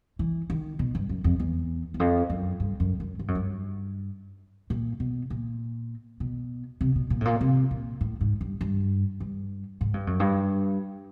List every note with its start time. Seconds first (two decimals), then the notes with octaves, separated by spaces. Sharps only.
0.19 E3
0.50 D#3
0.79 B2
0.95 G2
1.09 F#2
1.24 F2
1.40 E2
1.94 E2
2.00 F2
2.30 F#2
2.60 G2
2.80 F#2
3.00 F#2
3.19 G2
3.28 F#2
3.35 G2
4.70 A#2
5.00 B2
5.30 A#2
6.20 B2
6.81 C3
6.95 B2
7.10 A#2
7.21 A2
7.25 A#2
7.41 C3
7.71 A#2
8.01 A2
8.21 G#2
8.41 G2
8.61 G2
9.20 G2
9.81 G#2
9.94 G2
10.07 F#2
10.20 G2